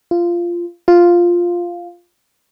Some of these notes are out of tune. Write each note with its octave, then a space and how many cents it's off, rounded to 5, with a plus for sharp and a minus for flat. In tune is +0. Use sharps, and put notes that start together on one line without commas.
F4 -15
F4 +0